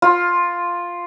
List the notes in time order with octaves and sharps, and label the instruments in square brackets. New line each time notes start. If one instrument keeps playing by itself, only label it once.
[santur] F4